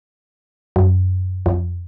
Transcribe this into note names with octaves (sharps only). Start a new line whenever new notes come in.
F#2
F2